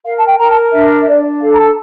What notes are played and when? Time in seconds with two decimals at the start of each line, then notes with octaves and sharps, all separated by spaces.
0.04 A#4 F5
0.18 A5
0.27 G5
0.38 A#4 A#5
0.49 A5
0.72 D4 E5
1.01 E5
1.07 D4 D5
1.42 A4 F5
1.52 A#5
1.59 A5